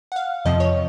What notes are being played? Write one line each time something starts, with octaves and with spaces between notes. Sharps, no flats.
F#5
F5
F2 C3 F3 D#5
C#5